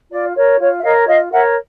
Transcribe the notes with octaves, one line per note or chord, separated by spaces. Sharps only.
F4 D5
A#4 C#5
F4 C#5
E5
A#4 C#5 D#5 F5
F4 D#5 F5
A#4 C#5 E5 F#5